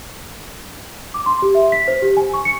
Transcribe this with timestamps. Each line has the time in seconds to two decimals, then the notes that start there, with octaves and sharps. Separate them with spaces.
1.14 D6
1.26 C6
1.42 G4
1.55 E5
1.72 B6
1.88 C5
2.02 G4
2.17 G#5
2.34 C#6
2.45 C#7